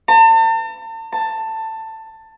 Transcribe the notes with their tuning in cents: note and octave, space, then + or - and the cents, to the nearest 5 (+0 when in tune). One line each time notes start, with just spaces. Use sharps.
A5 +40
A5 +15